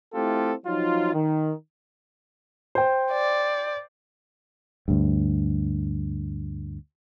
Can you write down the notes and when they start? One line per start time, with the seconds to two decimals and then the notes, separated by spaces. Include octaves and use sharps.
0.14 A3 C4 E4 F4 G4 A4
0.66 F3 F#3 D#4 F4
1.13 D#3
2.75 C5 G5
3.12 D5
4.88 D2 G2